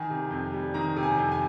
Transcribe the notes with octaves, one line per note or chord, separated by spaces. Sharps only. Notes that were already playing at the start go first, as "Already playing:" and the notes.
Already playing: D#3 G#5
C3
F2
G3
D#3 A#5
C3
G#5
F2
G#5